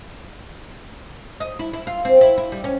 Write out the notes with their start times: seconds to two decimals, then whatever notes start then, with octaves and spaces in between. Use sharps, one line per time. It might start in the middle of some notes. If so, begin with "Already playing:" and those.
1.40 D#5
1.59 E4
1.73 E4
1.87 F4
2.05 C4
2.21 E4
2.38 E4
2.52 G3
2.64 C#4